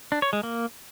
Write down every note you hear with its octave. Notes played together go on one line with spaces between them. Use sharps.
D4
C#5
G#3
A#3